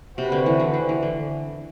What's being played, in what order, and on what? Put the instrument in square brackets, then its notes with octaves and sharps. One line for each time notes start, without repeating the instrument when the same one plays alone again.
[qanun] C3 [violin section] C4 F#4 B4
[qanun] D3
E3
D3
D3
E3
D3